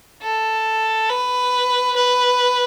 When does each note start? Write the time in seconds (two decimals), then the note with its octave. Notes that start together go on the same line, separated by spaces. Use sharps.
0.23 A4
1.09 B4
1.96 B4